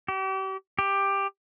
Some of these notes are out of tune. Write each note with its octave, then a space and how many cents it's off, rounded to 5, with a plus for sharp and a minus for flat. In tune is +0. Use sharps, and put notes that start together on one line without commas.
G4 -40
G4 +10